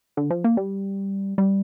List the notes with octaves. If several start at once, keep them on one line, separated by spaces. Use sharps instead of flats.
D3
F3
A#3
G3
G3